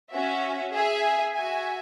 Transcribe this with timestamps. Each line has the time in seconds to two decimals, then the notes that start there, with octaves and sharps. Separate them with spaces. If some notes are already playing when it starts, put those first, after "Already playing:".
0.13 C#4 F#4 E5
0.73 G#4 E5 G#5
1.33 F#4 E5 G#5